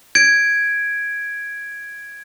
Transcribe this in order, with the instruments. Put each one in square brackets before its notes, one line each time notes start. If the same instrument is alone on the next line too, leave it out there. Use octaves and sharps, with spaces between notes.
[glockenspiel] G#6 D7